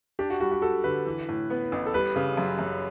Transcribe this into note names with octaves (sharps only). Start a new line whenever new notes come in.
D4 G4
F#4
G3 F#4
F#4
F#4 A4
D3 B4
E3
A2
B3
A1
A4
G3 B4
C#3
F#2
F#2